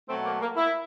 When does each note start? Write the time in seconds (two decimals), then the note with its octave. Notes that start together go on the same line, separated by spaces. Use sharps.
0.08 B2 F#3 A3 C4
0.25 A#3
0.41 A#3
0.56 E4